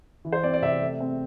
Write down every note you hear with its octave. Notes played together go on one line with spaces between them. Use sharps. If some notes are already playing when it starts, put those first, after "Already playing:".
E3
C5
C4 D5
D5
C3 E5
A3
C4